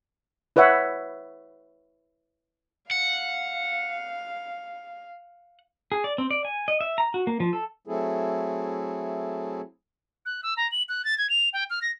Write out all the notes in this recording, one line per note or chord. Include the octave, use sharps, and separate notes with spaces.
E4 B4 C#5 E5 F#5
F5 F#5
G#4
D5
C4
D5
G#5
D#5
E5
A#5
F#4
A#3
F3
A4
F#3 A3 C4 E4 G#4 A4
F#6
E6
A#5
F#7
F#6
A6
G#6
F7
G5
F6
A#6